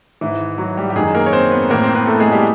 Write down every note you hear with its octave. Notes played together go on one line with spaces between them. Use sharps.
G#2 D#3 E3 E4
F#3 F#4
G3 G4
G4
F#2 D#3 G#3 G#4
A#3 A#4
C#5
C4 C5
B3 B4
A2 E3 A#3 A#4
C4 C5
B3 B4
A3 A4
G#3 G#4
G3 G4